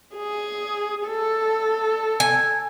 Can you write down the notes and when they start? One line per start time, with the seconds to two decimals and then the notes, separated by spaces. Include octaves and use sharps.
0.16 G#4
1.06 A4
2.20 G#5